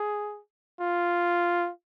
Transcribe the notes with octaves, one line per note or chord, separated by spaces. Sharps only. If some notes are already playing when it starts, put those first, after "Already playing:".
Already playing: G#4
F4